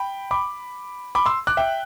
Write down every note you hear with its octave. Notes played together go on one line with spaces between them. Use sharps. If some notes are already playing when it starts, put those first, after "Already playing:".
Already playing: G5 B5
B5 D6
B5 D6
C6 E6
D6 F#6
E5 G5